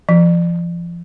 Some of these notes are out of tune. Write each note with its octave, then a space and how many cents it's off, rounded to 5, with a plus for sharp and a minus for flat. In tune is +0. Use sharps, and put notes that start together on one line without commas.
F3 -30